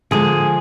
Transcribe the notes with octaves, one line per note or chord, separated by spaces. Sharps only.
D3 F3 G#3 G#4